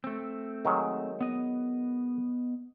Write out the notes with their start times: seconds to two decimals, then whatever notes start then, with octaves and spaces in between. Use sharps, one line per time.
0.04 A3 C4
0.65 D#3 F#3 G#3
1.21 B3 D#5